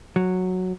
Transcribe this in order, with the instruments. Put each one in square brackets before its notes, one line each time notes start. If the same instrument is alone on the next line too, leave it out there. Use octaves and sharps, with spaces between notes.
[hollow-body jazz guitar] F#3